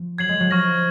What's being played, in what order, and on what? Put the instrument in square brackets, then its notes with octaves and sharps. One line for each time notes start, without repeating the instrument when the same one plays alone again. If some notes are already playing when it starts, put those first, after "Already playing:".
Already playing: [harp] F3
[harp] F#3 [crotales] G#6 C7 F#7
[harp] G#3
F#3
[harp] F3 [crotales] C#6 F6 A#6